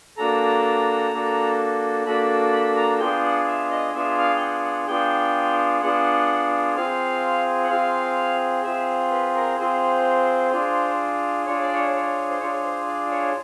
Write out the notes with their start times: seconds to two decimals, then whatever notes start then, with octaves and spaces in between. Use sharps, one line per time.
0.17 A#3 D4 F#4 A4 A#5
1.12 A#3 D4 F#4 A4
2.05 A#3 D4 F#4 A4 B5
2.52 B5
2.76 A#5
2.99 B3 D4 F4 G#4 G5
3.23 F#5
3.47 E5
3.70 D#5
3.93 B3 D4 F4 G#4 E5
4.18 F5
4.36 G5
4.40 F#5
4.64 F#5
4.87 B3 D4 F4 G#4 G5
5.82 B3 D4 F4 G#4 F#5
6.76 C4 F4 G#4 F5
7.64 F#5
7.69 C4 F4 G#4 F5
8.63 C4 F4 G#4 E5
9.11 B4
9.35 A#4
9.58 C4 F4 G#4 C5
10.52 D4 F4 G#4
11.46 D4 F4 G#4 C#5
11.61 D5
11.74 C#5
11.94 C#5
12.29 C5
12.40 D4 F4 G#4 C#5
12.64 C5
12.87 D5
13.11 C#5